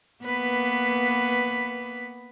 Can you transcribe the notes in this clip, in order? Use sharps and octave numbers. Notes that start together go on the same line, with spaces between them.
A#3 B3 B4